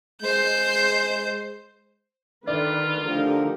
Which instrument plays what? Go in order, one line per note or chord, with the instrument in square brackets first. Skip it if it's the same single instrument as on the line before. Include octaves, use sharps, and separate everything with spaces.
[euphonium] G#3 [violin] C5 G6
[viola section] D3 D#3 B4 [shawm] F4 [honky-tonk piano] D5
[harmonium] D3 F3 A#4 [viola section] A3 D#4 G4